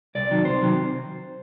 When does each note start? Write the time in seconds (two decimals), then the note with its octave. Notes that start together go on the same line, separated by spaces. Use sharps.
0.15 C2 D5
0.30 C3 D#3 F#3
0.45 C2 C5
0.61 C3 D#3 F#3